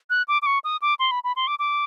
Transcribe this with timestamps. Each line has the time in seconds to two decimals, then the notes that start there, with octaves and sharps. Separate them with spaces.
0.10 F#6
0.28 D6
0.42 D6
0.46 C#6
0.64 D#6
0.82 D6
0.99 C6
1.11 B5
1.24 B5
1.36 C6
1.47 D6
1.59 D6